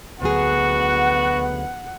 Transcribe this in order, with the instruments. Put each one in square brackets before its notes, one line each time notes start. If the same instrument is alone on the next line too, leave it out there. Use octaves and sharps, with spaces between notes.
[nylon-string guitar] D2 F#3 G#4 [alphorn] B3 [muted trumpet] F#4 [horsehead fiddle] F#5